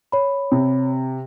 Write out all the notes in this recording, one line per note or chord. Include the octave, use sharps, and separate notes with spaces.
C#5 B5
C3